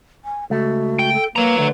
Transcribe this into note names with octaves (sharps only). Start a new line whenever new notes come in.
G#5
C#2 A3 F#4
G5
A4
A#3 B4 C#5 A#5
D3 A3